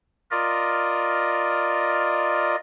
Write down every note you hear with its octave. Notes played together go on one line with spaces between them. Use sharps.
F4 A#4 D5 D#5